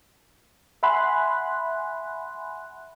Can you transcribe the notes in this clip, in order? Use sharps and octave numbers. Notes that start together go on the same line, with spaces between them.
E5 F#5 G#5 B5 C6 F#6